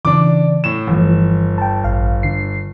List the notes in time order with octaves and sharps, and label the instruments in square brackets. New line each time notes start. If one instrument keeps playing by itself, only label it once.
[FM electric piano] C#3 E3 [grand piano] D4 D6
[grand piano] A2 E7
[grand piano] G1 [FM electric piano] E3 F3
[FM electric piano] G5 A5
A1 F5
D3 C7